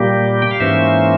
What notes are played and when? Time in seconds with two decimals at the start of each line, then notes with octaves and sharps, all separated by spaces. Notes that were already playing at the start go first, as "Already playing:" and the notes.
Already playing: A#2 G3 A#3 G4
0.42 G5
0.51 F5
0.60 G#2 E3 A#3 C#4 C5 E5